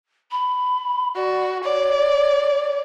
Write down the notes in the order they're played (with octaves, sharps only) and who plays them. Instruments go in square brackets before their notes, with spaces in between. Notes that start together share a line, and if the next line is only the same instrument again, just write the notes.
[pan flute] B5
[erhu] F#4 [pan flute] D5
[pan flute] C#5 [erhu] D5